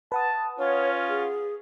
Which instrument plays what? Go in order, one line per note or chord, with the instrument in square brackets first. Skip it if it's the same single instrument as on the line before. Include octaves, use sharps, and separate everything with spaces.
[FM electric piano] B4 F#5 D#6 [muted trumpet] A5
[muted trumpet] C#4 [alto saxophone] F4 [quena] C#5
[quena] G#4